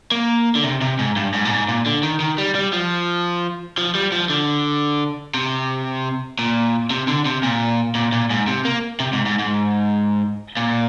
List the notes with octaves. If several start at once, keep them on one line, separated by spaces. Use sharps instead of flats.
A#3
D3
C3
C3
G#2
G2
G#2
A#2
G#2
A#2
D3
D#3
D#3
G3
G3
F3
F3
G3
F3
D3
C3
A#2
C3
D3
C3
A#2
A#2
A#2
G#2
C3
A#3
C3
G#2
G#2
G#2
A#2